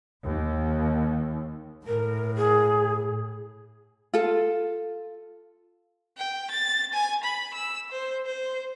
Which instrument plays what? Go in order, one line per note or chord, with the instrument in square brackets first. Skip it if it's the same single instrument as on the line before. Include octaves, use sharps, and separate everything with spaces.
[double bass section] D#2
[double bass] A2 [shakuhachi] A#4
[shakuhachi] G#4
[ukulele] F4 A4
[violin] G5
A6
G#5
B5
E6
C5
C5